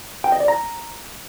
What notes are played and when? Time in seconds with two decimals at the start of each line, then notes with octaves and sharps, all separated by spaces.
0.24 G5
0.32 D#5
0.40 D5
0.48 A#5